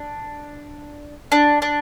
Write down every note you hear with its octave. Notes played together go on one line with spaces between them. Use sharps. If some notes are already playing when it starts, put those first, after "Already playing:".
Already playing: D4
D4
D4